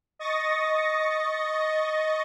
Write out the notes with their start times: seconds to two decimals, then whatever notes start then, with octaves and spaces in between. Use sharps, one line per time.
0.19 D#5 C#6 A6 A#6